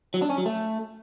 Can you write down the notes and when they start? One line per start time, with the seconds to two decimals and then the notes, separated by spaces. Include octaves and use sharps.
0.14 F#3
0.22 D4
0.30 C#4
0.38 F#3
0.46 A3